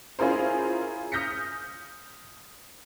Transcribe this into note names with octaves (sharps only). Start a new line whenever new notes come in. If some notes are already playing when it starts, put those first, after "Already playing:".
C#4 E4 F4 G#4 A#4 C5
D#6 F6 G6 A#6 B6 C#7